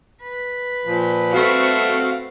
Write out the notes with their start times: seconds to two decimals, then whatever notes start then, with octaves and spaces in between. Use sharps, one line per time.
0.22 B4
0.85 A#2 F3
1.34 G3 A3 C4 F#4 F5